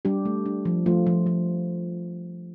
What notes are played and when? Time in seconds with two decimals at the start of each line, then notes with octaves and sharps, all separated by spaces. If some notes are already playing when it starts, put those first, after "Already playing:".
0.05 G3 D4 G4
0.25 A3
0.46 D4
0.65 F3
0.86 F3 A3 F4
1.07 F3
1.26 F3